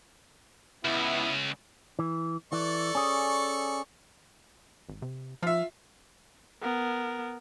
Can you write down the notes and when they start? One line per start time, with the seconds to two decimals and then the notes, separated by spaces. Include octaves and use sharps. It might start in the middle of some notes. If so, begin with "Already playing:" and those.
0.85 C#2 B3 E4
1.99 E3
2.53 E3 A4 D5 C#6
2.95 C#4 G#4
4.89 G#1
5.02 C3
5.43 F3 F4 E5
6.62 B3 A#4